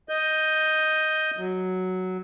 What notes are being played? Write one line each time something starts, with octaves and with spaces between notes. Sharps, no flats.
D#5 G6
F#3